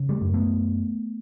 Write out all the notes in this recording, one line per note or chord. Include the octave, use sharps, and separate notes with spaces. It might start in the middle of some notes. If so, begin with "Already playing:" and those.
Already playing: C#3
G3 A3
F#2
A3 B3